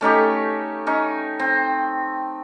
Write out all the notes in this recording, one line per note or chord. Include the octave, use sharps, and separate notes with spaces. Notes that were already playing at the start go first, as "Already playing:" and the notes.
A3 C#4 D#4 G4
C#4 D#4
C4